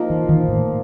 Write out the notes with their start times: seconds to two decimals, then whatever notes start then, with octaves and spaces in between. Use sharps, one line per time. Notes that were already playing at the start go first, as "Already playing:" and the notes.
Already playing: F3 A#3 D#4
0.10 E3
0.29 D#3
0.48 A2